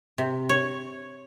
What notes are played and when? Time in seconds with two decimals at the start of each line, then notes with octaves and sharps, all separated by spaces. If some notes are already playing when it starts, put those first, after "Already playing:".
0.18 C3
0.49 C#5